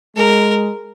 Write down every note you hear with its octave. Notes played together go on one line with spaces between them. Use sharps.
G#3 A#4